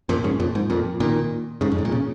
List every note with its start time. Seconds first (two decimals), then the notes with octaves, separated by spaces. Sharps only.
0.09 F2 A#2
0.24 G#2 C#3
0.40 F2 A#2
0.55 G#2
0.70 F2 A#2
1.00 A#2 D#3
1.61 G#2 C#3
1.72 F2
1.78 G#2
1.85 A#2
1.92 C#3